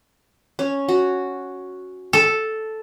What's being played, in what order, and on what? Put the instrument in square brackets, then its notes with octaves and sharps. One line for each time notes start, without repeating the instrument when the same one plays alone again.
[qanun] C#4
F#4
[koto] A4